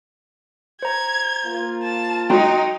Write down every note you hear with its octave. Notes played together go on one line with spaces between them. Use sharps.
C5 A#5 G#6
A#3 F4
A5
F#3 D#4 G5 A#5 C6